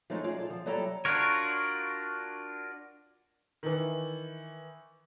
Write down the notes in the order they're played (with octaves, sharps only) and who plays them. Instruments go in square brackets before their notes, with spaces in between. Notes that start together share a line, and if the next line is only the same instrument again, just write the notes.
[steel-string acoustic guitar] F3 G#3 A3 C#4 D#4
F#3 F4 G#4 D5
F4 A4
F3
F#3 G3 E4 A4 G5 A#5
[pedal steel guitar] D4 F4 F#4 A#4 C#5
[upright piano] D#3 E3